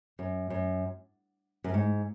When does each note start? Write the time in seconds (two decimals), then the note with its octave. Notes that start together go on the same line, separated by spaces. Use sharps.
0.19 F#2
0.50 F#2
1.64 F#2
1.74 G#2